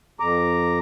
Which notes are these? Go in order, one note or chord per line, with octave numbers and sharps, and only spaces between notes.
F2 A#5 D6